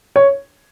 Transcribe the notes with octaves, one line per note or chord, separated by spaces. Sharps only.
C#5